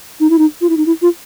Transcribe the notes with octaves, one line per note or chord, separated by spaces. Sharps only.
D#4
E4
D#4
F4
E4
D#4
E4
F4